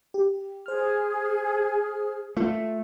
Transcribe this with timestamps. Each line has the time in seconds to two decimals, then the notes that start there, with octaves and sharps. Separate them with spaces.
0.14 G4
0.66 G#4 C5 F6
2.37 A3 F4